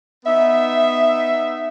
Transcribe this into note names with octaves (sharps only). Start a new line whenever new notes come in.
B3 D#4 E5